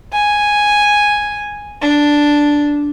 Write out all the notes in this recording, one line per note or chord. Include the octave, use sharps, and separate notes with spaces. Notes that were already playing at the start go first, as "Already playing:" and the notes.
G#5
D4